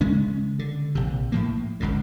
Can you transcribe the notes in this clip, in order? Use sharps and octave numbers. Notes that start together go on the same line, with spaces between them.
C#3 G#3 C#4
D3
A#1 C3
A2 F3 A#3
G1 C#2 F#2 A2